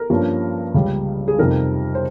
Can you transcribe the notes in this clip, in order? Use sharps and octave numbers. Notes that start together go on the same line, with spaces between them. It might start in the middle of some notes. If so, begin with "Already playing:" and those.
Already playing: A#4
G2 F3 A#3 C#4
C#2 C#3 G3
G#4
F2 C3 G3 C4 D#4 A#4
C5